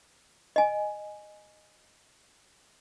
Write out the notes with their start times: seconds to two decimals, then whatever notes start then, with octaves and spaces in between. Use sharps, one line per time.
0.56 D#5 G#5